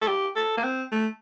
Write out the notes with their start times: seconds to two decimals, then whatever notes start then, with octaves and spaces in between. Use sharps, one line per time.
0.02 A4
0.07 G4
0.36 A4
0.57 A#3
0.63 C4
0.92 A3